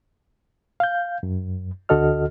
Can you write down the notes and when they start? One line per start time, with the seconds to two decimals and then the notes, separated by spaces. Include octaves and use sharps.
0.80 F5 G6
1.23 F#2
1.89 D2 D3 F#4 A4 D#5 F6